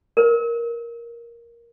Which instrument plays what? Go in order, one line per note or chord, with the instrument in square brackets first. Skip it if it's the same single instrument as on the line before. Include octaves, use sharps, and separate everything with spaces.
[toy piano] A#4 B4